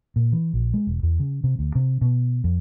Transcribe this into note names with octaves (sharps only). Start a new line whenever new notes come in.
A#2
E3
A#1
G#3
E1
E2
C#3
C3
D2
C3
B2
F2